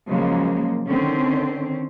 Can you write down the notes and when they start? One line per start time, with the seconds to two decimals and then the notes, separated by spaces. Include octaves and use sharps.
0.10 C#3 F3 F#3 G#3 A#3
0.88 D3 D#3 C4 C#4